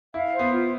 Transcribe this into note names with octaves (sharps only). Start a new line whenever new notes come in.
E4 F5
C5
B3
F4